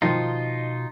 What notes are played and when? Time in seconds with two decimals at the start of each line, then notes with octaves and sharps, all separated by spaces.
0.02 B2 D#3 F3 D#4 F4